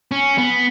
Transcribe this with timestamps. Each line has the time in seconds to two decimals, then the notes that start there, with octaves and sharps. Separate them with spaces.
0.12 C#4
0.38 B3